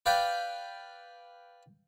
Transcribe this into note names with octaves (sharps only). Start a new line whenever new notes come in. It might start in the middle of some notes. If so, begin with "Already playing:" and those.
B4 D5 F5 G5